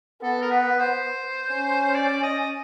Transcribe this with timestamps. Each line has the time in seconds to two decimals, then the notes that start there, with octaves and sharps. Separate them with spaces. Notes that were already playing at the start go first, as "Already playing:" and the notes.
0.22 B3 A4
0.42 A#4
0.51 B4
0.80 C5
1.52 C#4
1.94 D5
2.23 D#5